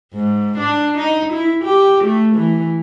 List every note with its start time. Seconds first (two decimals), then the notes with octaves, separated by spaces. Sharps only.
0.13 G#2
0.58 D4
0.97 D#4
1.33 E4
1.64 G4
2.04 A3
2.36 E3